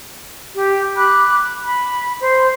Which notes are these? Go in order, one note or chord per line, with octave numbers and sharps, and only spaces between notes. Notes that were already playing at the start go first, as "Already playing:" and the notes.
G4
B5 D6 F#6
B5
C5